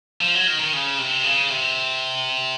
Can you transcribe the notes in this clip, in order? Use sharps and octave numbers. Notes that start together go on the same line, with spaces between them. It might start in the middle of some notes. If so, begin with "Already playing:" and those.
F3
F#3
D#3
D#3
C#3
C3
C#3
C3